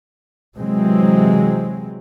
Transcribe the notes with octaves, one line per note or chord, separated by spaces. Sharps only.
C3 E3 F#3 G#3 C4